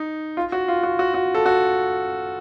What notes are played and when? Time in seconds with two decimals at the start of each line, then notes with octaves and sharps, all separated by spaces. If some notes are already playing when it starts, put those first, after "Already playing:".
Already playing: D#4
0.37 F4
0.52 F#4
0.68 F4
0.83 F#4
0.99 F#4
1.14 F#4
1.35 A4
1.46 F#4